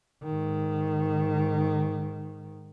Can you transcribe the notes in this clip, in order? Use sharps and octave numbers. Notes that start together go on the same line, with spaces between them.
G#2 D#3